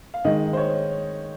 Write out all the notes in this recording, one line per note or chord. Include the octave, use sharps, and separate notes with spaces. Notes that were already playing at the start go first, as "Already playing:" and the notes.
F5
D#3 G#3 D#5
C5
C#5